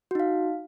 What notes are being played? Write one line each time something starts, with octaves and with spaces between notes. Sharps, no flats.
D#4 F#4 F5